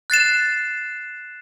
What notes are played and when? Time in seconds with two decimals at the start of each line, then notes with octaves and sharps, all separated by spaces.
0.10 F#6 A6 C7 E7